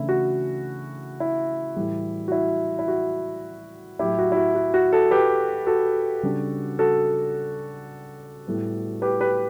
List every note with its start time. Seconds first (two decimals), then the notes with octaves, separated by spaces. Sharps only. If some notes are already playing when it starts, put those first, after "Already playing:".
Already playing: C#3 E3 A3 D4 E4
0.09 F#4
1.20 E4
1.76 A2 E3 G3
2.28 F#4
2.32 E4
2.79 E4
2.88 F#4
3.99 A2 F#3 A3 E4 G4
4.19 F#4
4.32 E4
4.37 F#4
4.55 F#4
4.74 F#4
4.93 F#4 A4
5.11 G4 B4
5.67 F#4 A4
6.23 C#3 G3 D4
6.79 F#4 A4
8.47 A2 G3 B3
9.02 G4 B4
9.21 G4 B4